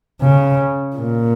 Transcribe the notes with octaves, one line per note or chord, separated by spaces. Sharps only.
C#3
A#2